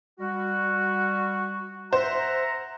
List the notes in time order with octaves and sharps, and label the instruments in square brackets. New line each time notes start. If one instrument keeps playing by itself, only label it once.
[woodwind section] G3 F#4
[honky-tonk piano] C5 [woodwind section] E5 F#5 A#5